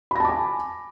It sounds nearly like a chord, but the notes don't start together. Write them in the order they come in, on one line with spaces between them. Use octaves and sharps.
B5 A#6 A5 D6 G#5